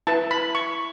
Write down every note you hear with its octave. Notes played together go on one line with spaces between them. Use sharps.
E4 B4 A5
B5
C#6